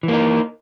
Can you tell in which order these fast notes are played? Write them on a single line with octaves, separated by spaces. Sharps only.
E3 A#3 D#4